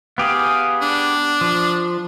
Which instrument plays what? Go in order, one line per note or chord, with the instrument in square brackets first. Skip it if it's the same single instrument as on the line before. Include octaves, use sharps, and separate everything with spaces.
[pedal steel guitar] B3 G4 G#4 [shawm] F5
[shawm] D4
[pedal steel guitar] F3